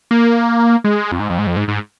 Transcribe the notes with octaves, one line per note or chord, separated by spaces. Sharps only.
A#3
G#3
F2
G#2
F2
G#2
F2
G#2
G#2